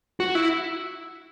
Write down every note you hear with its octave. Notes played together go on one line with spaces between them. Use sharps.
F#4
E4